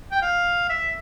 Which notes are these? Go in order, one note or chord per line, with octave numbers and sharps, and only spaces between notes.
G5
F5
E5